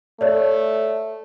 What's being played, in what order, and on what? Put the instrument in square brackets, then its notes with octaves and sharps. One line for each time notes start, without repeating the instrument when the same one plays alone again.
[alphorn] A3 [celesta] C#5 D5